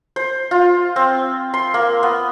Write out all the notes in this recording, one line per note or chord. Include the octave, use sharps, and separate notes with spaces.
C5
F4
C4
C6
A#3
B3